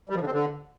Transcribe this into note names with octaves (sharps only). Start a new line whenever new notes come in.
G3
F3
D3
C4
D3